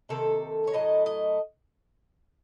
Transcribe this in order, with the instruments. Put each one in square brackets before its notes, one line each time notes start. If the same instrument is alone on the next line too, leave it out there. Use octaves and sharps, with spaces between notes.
[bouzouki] C3 D#3 A#3 A4
C#5
A2 F#3 A3 D#5
D#5